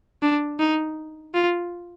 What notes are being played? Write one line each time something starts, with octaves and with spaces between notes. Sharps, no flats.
D4
D#4
F4